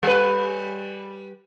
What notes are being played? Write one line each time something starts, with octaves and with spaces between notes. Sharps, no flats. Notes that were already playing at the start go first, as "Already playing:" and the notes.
G3 B4